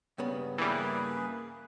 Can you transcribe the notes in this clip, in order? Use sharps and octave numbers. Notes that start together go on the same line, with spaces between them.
G2 C#3 B3
E3 G3 A#3 G#4 B4